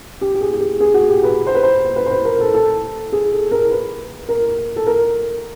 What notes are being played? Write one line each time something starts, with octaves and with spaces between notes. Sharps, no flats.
G4
G4
G#4
G4
G#4
G#4
F#4
G4
B4
C5
B4
C5
B4
C5
B4
A#4
A4
A4
G#4
A4
A#4
B4
A#4
A4
A#4